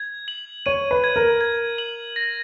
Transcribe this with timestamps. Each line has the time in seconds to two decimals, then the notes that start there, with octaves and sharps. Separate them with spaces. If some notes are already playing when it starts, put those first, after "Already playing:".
Already playing: G#6
0.28 F#7
0.66 C#5 D#7
0.91 B4
1.04 G#6
1.16 A#4
1.41 G#6
1.78 F#7
2.16 A#6